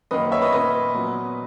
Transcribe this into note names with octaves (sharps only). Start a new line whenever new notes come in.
F#2 D#3 A#3 B4 D#5
C#5 E5
B4 D#5
A#2 A#3 C#4 B4 D#5
A#2 F#3 B3